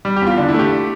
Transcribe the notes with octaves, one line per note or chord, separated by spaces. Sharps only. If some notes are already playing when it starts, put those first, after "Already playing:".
G3
G4
E2 F4
D3 D4
E4
A3
G4